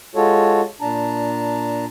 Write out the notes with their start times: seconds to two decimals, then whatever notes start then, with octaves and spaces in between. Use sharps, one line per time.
0.15 G#3 F4 F#4 A4 C#5
0.81 A#2 D4 A5 A#5